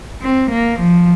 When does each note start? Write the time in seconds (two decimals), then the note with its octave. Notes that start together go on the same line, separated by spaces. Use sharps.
0.22 C4
0.50 A#3
0.79 F3